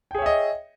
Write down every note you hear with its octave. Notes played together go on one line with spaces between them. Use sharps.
G#4 C#5 D#5 E5 G5